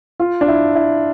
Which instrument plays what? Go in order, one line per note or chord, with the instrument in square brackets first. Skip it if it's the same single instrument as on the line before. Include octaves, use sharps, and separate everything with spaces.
[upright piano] F4
D4
E4
E4